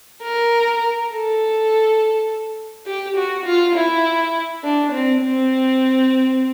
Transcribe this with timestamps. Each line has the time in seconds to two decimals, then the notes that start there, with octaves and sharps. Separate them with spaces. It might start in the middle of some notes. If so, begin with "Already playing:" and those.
0.23 A#4
1.11 A4
2.86 G4
3.16 F#4
3.46 F4
3.75 E4
4.63 D4
4.92 C4
5.22 C4